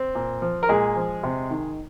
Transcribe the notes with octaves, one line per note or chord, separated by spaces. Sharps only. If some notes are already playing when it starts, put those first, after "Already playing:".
Already playing: C4
A#2
F3
A#4
A#2 G#3 G#4
F3
C3
D#3